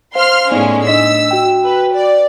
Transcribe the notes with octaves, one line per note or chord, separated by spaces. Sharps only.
C5 F5 C6 F6
A2 G#3 B3 C#4 D#4 D5
D4 D#5 E6 B6
F#4 G5
B4
D5